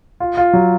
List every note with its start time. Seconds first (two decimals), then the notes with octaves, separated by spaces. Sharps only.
0.20 F4
0.37 F4
0.53 F#3